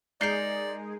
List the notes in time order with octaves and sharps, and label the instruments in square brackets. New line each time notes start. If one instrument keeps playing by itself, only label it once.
[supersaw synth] G#3 G#4 [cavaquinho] D#4 A#4 [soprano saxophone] D5 [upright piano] G6 C7